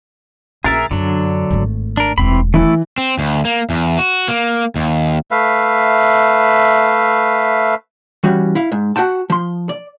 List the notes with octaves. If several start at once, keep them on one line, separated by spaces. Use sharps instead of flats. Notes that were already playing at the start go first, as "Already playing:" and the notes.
A#1 B3 G#4 A#4 E5 A6
F#2 D3 F#3 B3 D4
G#1 A3
D4 A#4
E1 D2 E3 C4 B5
E3 A3 E4 A4
C4
D2
A#3
E2
F#4
A#3
D#2
A3 B4 E5 F5
E3 G3 C#4 F#4
E4 F5
G#2
F#4 F#5 G5 A5
F3 C6
D5